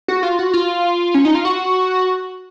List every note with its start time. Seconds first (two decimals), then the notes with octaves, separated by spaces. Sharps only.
0.08 F#4
0.23 F4
0.39 F#4
0.53 F4
1.14 C#4
1.25 D#4
1.35 F4
1.45 F#4